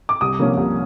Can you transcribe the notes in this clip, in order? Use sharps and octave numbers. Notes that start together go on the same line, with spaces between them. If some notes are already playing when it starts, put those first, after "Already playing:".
D6
C2 D#6
C3 F3 A#3 C#4
C2